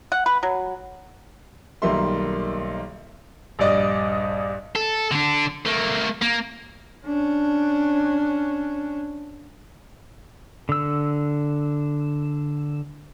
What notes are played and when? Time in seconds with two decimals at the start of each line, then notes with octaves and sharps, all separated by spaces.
0.12 F#5
0.26 B4
0.43 F#3
1.82 B1 D#3 G3 A#3 E5 C6
3.59 A#1 G2 D5 D#5
4.75 A4
5.11 D3 D4
5.66 A3 A#3
6.22 A#3
7.05 C#4 D4
10.69 D3 E6